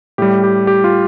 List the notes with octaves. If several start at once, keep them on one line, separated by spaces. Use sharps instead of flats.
A2 G3 G4
G4
G4
F4